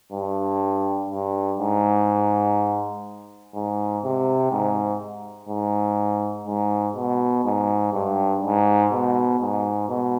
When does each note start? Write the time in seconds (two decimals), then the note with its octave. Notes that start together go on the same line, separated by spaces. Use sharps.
0.12 G2
1.10 G2
1.59 G#2
3.54 G#2
4.04 C3
4.51 G#2
5.49 G#2
6.46 G#2
6.96 B2
7.44 G#2
7.93 G2
8.43 G#2
8.92 B2
9.40 G#2
9.88 B2